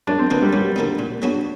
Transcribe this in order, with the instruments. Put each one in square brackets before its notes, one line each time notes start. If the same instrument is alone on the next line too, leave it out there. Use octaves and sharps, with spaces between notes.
[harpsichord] F#2 [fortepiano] D4
[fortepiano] C4
[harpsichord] D3 F3 A#3 D#4 [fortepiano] B3
[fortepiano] G3
[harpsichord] F#2 [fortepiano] G3
[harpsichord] D3 F3 A#3 D#4
A#2
F#3 B3 D4 F#4